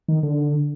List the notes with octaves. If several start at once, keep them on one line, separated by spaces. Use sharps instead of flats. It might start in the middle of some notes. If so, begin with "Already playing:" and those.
D#3
D3